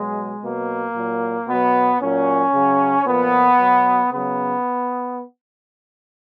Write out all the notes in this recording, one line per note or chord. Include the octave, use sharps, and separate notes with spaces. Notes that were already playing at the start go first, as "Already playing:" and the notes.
Already playing: B2 F#3 G#3
B2 F#3 A#3
A#2 F#3
B2 F#3 B3
A#2 F#3 C#4
C#3 F#3
A#2 F3 B3
B2 F#3
C#3 F#3 B3